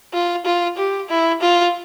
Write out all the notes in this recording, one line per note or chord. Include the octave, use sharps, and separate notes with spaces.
F4
F4
G4
E4
F4